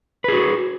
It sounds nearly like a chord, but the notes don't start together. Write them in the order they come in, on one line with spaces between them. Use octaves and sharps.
B4 G#4 F#4